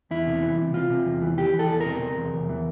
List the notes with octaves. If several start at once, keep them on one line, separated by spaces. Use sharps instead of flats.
E2 E4
C3
E3
C3
C3 F4
C3
E2
E3
E3 G4
E3
A4
E2
A#4
C3
C3
E2
E2
E3